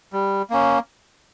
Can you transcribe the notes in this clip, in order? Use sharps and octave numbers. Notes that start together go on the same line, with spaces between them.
G3
A#3 C#4